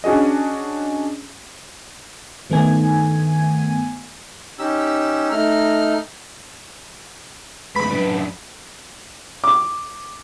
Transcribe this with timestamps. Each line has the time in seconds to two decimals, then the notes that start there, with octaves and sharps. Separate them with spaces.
0.04 C#4 D4 F#4 G#4 D#5
2.50 G2 D#3 A3 B3 G#5 G#6
4.59 C#4 D#4 G4 E6
5.31 A3 D#4 F6
7.76 D2 G#2 B4 B5 B6
7.91 F#2 D4
9.44 D6